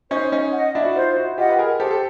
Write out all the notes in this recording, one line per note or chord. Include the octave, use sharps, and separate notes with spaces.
C#4 D#4 C5
C#4 D#4
D#5 F#5
D4 E4
F#4
D#4 F4 C5
E4 F#4
F4 G4 D#5 F#5
B4
G#4 A#4
G4 A4 C5
A4